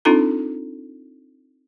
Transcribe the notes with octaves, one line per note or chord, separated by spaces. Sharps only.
C4 D4 D#4 F4 A4 A#5